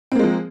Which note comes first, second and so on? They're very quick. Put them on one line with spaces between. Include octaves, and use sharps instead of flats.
C4 A#3 G#3 F3